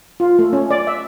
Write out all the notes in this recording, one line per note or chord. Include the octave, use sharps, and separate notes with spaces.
F4
A3
C#4
D5
E5